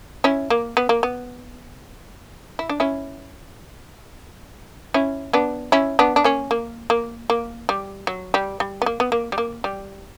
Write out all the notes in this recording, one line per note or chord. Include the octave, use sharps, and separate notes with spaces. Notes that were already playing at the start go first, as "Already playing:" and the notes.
C#4 E4
A#3
B3
A#3
B3
E4
D4
C#4 E4
C#4 E4
B3 D4
C#4 E4
B3 D4
D4
A#3 C#4
A#3
A#3
A#3
G3
F#3
G3
G3
B3
A#3
B3
A#3
G3
A#3
G3